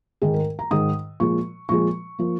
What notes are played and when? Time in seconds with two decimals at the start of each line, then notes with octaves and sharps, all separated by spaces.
0.22 G#2 D#3 G#3 G#4
0.34 A#4
0.59 A#5
0.71 G#2 D#3 G#3 D#6
1.20 A#2 F3 G#3 C#6
1.69 A#2 F3 G#3 C#6
2.19 F3 A#3